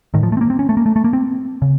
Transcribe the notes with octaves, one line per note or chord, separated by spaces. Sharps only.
A2 D#3
F3
A3
C4
A#3
C4
C#4
A3
A#3
A3
A3
A#3
C4
C#3